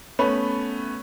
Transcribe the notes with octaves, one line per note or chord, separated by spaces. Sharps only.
A3 B3 C#4 B5